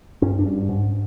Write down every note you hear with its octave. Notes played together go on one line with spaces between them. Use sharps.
G2 C#4
D4
G2
G#2